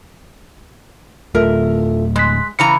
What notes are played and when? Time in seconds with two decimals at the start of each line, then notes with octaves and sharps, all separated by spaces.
1.35 D1 A3 F4 A4 A#4 E5
2.16 G#3 C6 F#6 B6
2.59 C#3 E3 A#5 C#7